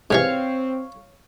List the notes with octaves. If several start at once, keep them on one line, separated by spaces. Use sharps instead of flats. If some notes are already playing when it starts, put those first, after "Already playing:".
G#2 C3 E3 C4 C#5 F5 C#6